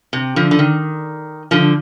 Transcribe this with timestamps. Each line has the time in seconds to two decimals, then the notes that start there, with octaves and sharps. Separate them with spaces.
0.13 C3
0.36 D3 F3
0.51 D3
0.59 D#3
1.51 D3 F3